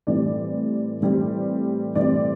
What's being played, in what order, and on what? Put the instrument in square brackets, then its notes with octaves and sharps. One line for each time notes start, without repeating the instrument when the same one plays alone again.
[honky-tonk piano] A2 E3 G3 C4 D5
A2 E3 G3 C4
A2 E3 G3 C4 D5